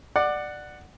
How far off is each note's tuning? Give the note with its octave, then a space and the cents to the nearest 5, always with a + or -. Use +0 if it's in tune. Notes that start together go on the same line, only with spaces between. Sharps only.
D5 +20 F#5 +0